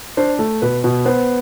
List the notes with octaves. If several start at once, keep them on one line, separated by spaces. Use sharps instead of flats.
D4 C5
A3
B2 B4
B2
B3 C5